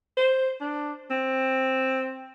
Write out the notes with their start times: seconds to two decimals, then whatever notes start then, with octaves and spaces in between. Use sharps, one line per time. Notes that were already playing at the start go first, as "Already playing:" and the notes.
0.17 C5
0.61 D4
1.11 C4